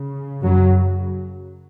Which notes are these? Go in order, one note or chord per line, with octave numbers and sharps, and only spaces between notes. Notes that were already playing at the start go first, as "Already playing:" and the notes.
Already playing: C#3
F#2 F#3